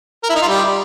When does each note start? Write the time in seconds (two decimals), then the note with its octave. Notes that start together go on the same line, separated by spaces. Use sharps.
0.23 A#4
0.30 E4
0.36 D#4
0.42 F4
0.48 G3